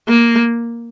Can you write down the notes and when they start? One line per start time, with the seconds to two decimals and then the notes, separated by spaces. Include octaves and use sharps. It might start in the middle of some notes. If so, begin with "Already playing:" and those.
0.09 A#3